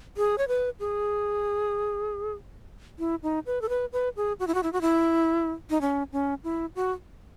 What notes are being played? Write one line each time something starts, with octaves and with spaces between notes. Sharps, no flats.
G#4
C#5
B4
G#4
E4
D#4
B4
A4
B4
B4
G#4
F#4
E4
F#4
E4
F#4
E4
D#4
C#4
C#4
E4
F#4